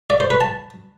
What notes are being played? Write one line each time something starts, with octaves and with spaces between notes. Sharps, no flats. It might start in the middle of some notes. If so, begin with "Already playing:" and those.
D5
C5
B4
A5